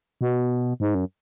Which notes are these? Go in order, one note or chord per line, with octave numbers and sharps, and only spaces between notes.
B2
G#2
F#2